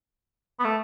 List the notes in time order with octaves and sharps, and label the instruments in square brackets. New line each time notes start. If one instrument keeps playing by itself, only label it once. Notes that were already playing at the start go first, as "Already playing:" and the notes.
[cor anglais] B3
A3